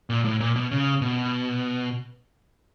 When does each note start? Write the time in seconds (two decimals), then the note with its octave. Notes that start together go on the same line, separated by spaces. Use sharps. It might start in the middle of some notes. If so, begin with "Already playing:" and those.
0.10 A#2
0.25 A2
0.40 A#2
0.56 B2
0.71 C#3
1.02 B2